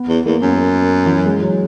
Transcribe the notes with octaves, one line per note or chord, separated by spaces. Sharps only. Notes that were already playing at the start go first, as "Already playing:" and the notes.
Already playing: B3
E2
E2 A#3
F#2
E3
F#3
G#3
F#3